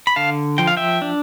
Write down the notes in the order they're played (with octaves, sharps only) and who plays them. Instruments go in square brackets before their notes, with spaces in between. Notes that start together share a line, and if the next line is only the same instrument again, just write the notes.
[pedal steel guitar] B5
D3 F5 A5
F3 G5
F5
E5 G5
D4